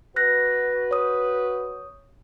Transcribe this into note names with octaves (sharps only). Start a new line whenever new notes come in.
F#4 B4 F#6 A#6
C#5 D#6